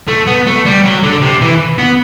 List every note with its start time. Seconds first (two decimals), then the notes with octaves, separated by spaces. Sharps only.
0.08 A3
0.27 B3
0.46 A3
0.65 G3
0.84 F#3
1.03 D3
1.21 C3
1.41 E3
1.78 B3